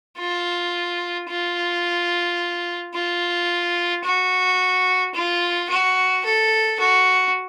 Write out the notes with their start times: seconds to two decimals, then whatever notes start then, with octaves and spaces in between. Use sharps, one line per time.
0.17 F4
1.29 F4
2.94 F4
4.04 F#4
5.14 F4
5.69 F#4
6.24 A4
6.79 F#4